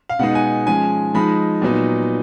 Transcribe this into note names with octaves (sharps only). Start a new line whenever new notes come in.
F5
B2 G#3 B3 D#4 F#5
G#5
F3 G#3 C#4 G#5
F3 G#3 D#4 B5
A#2 F#3 B3 D#4